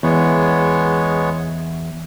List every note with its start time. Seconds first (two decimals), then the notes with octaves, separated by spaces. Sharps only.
0.03 E2 G#3 B3 C#5